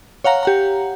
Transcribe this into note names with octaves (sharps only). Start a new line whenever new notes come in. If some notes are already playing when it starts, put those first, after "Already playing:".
C#5 F5 F#5 A#5
G4 F#5 A#5